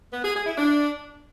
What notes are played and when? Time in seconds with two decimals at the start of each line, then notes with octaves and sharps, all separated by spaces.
0.13 B3
0.24 G#4
0.35 G#4
0.46 E4
0.57 D4